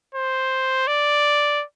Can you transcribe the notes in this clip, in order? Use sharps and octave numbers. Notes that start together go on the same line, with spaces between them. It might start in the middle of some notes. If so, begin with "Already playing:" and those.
C5
D5